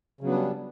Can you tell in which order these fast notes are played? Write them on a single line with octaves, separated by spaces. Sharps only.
C#3 F#3 B3 D4 G3